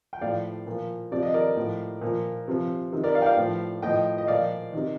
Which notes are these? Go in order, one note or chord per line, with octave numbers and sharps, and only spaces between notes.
G5
A2 F3 D5 F5
A#2 F3
C3 F3 D5
D#5
A#4 D5
A2 F3
A#2 F3
C3 F3
C3 D#3
A#4 D5
D5 F5
G5
D5 F5
A2 F3
A2 F3 D#5 G5
D#5
A#2 F3 D5 F5
C3 D#3